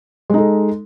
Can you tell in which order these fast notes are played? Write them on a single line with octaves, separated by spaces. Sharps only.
G#3 D#4 A4